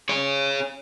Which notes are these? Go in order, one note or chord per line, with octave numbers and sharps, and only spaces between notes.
G#4 C#5